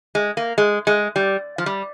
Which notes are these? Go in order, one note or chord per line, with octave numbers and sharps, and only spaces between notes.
G#3
A#3
G#3
G#3
G3
F3
G3